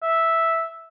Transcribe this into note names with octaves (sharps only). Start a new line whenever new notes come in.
E5